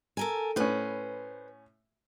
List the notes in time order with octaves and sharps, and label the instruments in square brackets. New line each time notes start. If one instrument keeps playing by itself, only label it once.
[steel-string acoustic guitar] A4 A#4 G#5
[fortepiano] A2 C#4 [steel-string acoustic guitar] B4 C5